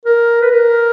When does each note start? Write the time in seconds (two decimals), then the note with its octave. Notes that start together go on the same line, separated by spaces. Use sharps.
0.05 A#4
0.42 B4
0.51 A#4